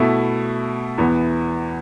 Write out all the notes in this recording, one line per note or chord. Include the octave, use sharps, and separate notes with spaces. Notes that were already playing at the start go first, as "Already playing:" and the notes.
Already playing: B2 A3 E4
E2 E3 B3